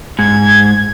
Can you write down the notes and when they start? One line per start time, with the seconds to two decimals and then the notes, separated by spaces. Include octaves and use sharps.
0.19 G#2 G#6